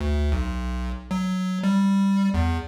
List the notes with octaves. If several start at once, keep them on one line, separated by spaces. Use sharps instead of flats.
D2
B1
F#3
G3
E2